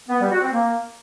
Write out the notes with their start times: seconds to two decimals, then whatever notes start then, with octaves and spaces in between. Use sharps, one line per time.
0.09 B3
0.20 G3
0.31 F#4
0.41 C4
0.52 A#3